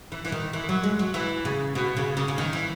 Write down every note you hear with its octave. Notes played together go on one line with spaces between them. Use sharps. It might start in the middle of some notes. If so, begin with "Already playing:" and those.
E3
E3
D#3
E3
F#3
G#3
F#3
E3
C#3
B2
C#3
C#3
C#3
D#3
E3